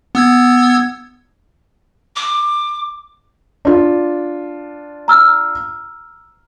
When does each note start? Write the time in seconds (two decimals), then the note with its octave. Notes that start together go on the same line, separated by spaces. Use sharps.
0.15 B3 E6 G#6
2.16 D6
3.65 D4 F4
5.08 A#5 E6 F6